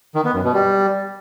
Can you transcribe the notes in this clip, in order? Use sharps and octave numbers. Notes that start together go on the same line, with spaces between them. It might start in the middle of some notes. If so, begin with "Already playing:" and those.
D#3
B3
F#2
B2
G3